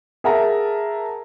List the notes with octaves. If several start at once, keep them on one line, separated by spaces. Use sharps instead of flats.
G#4 A#4 E5 F#5 A5 A#5